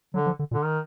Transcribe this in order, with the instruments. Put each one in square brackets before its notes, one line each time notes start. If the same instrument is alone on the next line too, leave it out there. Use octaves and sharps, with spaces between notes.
[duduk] D3 [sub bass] F#3
[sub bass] F3
D3
A#2
[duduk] D3
D#3